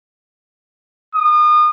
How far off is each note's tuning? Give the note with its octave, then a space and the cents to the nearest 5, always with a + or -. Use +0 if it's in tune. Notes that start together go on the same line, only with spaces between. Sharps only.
D#6 -35